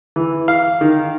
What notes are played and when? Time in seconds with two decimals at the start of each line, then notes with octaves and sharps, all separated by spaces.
0.16 E3
0.48 F5
0.81 D#3